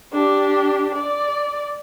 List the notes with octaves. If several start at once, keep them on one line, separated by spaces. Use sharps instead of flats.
D4 G4
D5